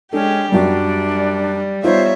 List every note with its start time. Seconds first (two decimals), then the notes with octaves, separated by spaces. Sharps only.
0.13 G#3 C#4 D4 G4 A4
0.52 F#2 F#3 G3 D4 F#4
1.84 G3 B3 D#4 F4 C5 C#5 E5